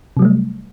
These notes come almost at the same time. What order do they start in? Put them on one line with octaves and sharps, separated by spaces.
C3 F#3 G3 A3